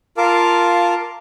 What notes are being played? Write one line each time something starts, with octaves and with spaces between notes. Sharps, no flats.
F4 A#4 F5 A5 D6